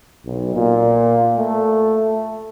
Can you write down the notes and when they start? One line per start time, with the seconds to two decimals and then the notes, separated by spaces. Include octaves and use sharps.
0.25 B1
0.54 A#2
1.38 A3